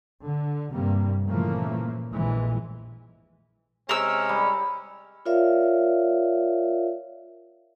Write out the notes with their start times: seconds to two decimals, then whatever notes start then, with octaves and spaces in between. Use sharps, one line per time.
0.23 D3
0.73 G2 C3 G3 A#3
1.27 A#2 C#3 E3 F3 A3 A#3
2.12 A#1 F2 A#2 E3 G#3
3.89 C3 G#3 C#4 A#4 E6
4.29 G3
5.26 F4 A#4 C#5 D5 E5 F5